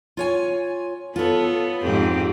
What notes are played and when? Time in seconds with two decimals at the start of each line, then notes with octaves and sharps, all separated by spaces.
0.17 F4 C#5 G#5
1.16 B3 F4 A4 C#5
1.83 F2 G#2 C4 G4